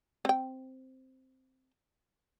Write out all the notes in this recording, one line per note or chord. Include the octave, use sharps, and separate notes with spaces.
C4 G5